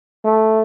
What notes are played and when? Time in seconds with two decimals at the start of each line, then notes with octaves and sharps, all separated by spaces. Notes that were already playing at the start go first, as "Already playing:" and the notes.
0.25 A3